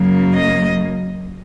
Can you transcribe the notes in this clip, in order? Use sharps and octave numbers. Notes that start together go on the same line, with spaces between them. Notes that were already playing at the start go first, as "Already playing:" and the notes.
Already playing: F#2 C#3 F#3 A#3
D#5